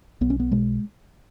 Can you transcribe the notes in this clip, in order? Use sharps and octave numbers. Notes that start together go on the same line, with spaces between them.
B1 B3
C#4
B3
B2 G#3